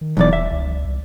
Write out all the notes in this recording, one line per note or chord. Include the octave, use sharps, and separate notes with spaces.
D#3
D#1 B1 E2 D5
E5
C#2
C2